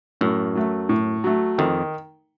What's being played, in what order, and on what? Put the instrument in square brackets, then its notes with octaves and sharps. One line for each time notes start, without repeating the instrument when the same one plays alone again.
[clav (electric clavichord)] F#2 [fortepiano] A2
[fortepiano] F#3 A3
A2
F#3 A3
[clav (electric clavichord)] F2 [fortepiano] D#3